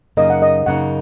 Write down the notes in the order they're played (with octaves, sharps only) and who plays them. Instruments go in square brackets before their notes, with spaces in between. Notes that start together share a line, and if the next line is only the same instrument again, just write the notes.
[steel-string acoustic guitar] F#2 C#3 A#3 D#4 [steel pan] D#5
[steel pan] F#5
D#5
[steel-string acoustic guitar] F#2 C#3 A#3 D#4 [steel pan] F#5